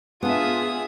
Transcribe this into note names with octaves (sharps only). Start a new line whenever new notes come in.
B3 D4 F4 G#4 E5 D#6